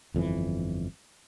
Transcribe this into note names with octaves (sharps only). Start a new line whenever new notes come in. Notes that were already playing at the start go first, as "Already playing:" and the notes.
G1 F2 A2 E3